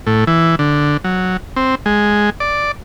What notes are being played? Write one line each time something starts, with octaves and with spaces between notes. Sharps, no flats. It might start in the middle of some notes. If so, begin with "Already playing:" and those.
A2
E3
D3
F#3
C4
G#3
D5